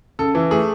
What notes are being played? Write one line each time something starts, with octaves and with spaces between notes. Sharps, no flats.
C#3 A4
E3
A3 G#4